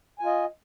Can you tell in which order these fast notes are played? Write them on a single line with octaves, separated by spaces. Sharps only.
G#5 F4 D#5